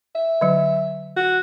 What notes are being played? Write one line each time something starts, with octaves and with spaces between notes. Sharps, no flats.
E5
D3 F#3
F#4